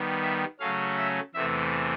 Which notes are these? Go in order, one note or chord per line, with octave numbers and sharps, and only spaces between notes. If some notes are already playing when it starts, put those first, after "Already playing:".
Already playing: D#3 G3 B3
E5
C#3 F#3 A3 C#4 F5
E5
E2 C3 E3 A3 E5